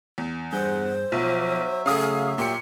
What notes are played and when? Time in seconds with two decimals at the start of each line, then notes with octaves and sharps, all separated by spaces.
0.18 E2
0.53 G2 G#4 C5 F#5 G6
1.12 B1 F3 F#3 E5
1.86 C#3 A3 G#4 F5 D#6
2.38 A#2 G4 C#7